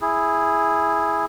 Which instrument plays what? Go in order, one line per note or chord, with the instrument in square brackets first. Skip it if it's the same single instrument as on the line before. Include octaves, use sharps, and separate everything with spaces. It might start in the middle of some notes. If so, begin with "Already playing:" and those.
[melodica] E4 G#4